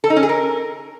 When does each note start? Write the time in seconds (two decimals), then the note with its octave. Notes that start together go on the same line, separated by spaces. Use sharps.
0.04 A4
0.10 D#4
0.16 C#4
0.23 G#4
0.29 A#4